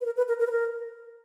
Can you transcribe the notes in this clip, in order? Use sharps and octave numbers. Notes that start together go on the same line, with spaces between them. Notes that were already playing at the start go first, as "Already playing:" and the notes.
B4
A#4
B4
A#4
A#4
B4
A#4